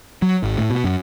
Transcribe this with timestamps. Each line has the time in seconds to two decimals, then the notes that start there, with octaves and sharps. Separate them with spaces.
0.22 F#3
0.43 G#1
0.58 A2
0.70 B2
0.84 F#2